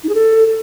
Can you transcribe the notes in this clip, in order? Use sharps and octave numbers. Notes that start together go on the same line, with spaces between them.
D#4
G#4
A4